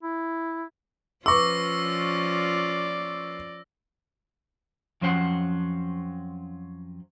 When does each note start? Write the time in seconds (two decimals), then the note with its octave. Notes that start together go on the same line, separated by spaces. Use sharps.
0.03 E4
1.26 F3 C#4 F4 B4 C#6 D6 E6 A#6
1.89 D5
5.01 F2 F3 F#3 C#4 C5 F#5